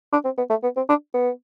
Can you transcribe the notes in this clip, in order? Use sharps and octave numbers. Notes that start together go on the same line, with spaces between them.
D4
C4
B3
A3
B3
C4
D4
B3